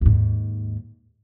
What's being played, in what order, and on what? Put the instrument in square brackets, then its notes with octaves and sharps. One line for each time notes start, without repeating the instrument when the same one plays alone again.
[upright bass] D#2 G#2